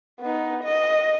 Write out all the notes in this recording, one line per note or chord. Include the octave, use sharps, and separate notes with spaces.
B3 D#4
D#5